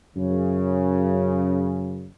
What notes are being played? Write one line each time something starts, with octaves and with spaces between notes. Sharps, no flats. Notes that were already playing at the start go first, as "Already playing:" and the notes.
F#2 C#3